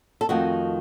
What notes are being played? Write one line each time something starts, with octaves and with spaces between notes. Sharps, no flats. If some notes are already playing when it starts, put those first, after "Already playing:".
A4
F2 D#3 A3 D#4 F#4